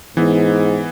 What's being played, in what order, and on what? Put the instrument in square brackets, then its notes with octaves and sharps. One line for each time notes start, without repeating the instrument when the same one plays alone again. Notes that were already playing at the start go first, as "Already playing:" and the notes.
[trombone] G#2 [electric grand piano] E3 B3